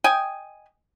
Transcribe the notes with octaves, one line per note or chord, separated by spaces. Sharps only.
D#5 G5 G#5